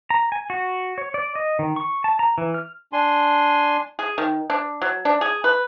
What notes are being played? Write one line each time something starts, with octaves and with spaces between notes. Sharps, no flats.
A#5
G#5
F#4
C#5
D5
D#5
D#3
C#6
A5
A#5
E3
F6
D4 G#5 C6
G#4
D#3
D4
F#3
D4
G#4
B4